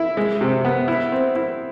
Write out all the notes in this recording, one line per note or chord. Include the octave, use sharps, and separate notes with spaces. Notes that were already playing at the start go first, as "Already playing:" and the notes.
Already playing: E4
G#3
C3
B3
E4
C4
E4